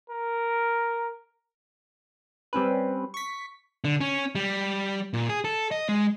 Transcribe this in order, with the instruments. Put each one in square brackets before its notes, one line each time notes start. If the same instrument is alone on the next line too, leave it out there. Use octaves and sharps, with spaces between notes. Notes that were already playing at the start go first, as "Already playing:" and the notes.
[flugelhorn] A#4
[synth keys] G3 C4 C#4 B4
C#6 B6
[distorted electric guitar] D3
C#4
G3
A#2
G#4
A4
D#5
G#3